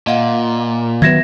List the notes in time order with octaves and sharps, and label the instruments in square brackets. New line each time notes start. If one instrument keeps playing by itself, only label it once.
[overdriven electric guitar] A#2 [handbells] D#5 F5 F#5
[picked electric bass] D#3 F#3 B3 [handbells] E5 [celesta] G#6 A#6 E7